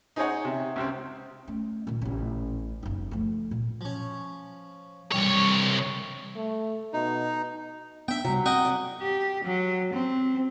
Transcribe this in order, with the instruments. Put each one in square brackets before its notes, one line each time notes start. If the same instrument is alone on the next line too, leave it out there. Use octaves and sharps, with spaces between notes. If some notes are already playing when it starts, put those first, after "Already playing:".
[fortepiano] D#4 G#4 C5 C#5 D#5 F#5
C3
C#2 C3 C4
[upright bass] A3 C#4
A#2 D#3
A1 C#4
F#1 D#4
F3 A3
A#2
[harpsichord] F3 C#4
[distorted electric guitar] C2 C#5 [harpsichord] G2 E3 G3
[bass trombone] A3
[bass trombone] B2 [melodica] D#4
[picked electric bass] B3 D4 [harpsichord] E5 G5
[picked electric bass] C3 G3 [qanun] F#3
[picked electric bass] C4 [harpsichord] F#4 D#5 G5
[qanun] D5 F#5
[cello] G4
F#3
C4